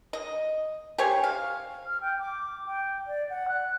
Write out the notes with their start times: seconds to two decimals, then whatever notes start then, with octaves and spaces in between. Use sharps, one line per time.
0.13 D#5
0.98 G4 C5 C#5 G#5
1.24 F5
1.86 F6
2.01 G5
2.20 D6
2.66 G5
3.07 D5
3.30 F#5
3.48 F#6